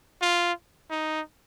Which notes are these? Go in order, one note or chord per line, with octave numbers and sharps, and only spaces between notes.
F4
D#4